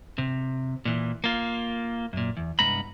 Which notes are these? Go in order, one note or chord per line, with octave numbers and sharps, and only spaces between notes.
C3
A#2 E3
A#3 F4
F#2 A#2
E2
C2 G2 G#3 B3 A#5 B5